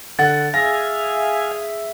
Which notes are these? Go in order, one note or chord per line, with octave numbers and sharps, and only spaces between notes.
D3 F#5 A6
G#4 E5 F5 G#5 A#6